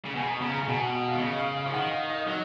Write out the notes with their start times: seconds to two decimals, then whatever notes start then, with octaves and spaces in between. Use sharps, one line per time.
0.06 C#3
0.15 B2 G#5
0.23 B5
0.28 A#5
0.41 C#3 B5
0.56 A#5
0.63 C#3
0.68 B2 G#5
0.81 F#5
0.95 F#5
1.08 F5
1.14 D#3
1.21 C#3 D#5
1.38 F5
1.57 F5
1.66 F3
1.74 D#3 F#5
1.92 F5
2.09 D#5
2.27 F#3 D#5